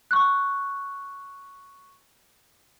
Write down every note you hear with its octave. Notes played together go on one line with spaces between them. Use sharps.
C#6 F#6